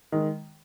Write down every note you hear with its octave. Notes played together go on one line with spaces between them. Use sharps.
D#3 G#3